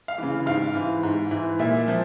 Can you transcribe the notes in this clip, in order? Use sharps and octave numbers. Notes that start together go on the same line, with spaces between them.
F5
C#3 E3
G#2 F5
E3
G#2
E3
A#2 E5
F3